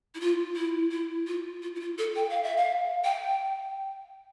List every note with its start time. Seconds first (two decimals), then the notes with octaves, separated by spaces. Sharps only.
0.15 E4
0.20 F4
0.56 E4
0.91 E4
1.27 F4
1.62 F4
1.76 E4
1.80 F4
1.98 A4
2.16 G5
2.30 F5
2.43 E5
2.57 F5
3.04 G5